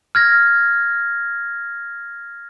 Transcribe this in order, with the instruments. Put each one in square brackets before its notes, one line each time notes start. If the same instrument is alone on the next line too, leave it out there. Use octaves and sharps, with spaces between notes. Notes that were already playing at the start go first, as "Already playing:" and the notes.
[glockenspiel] F6 G#6 A#6